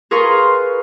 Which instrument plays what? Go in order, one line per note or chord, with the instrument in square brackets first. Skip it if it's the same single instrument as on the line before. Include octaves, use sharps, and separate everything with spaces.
[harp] F4 G#4 A#4 B4 C6 C#6